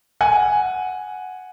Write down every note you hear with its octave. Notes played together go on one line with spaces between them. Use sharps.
F#5 G#5